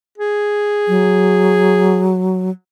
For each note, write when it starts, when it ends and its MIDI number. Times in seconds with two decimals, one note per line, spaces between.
0.18 2.13 68
0.88 2.50 54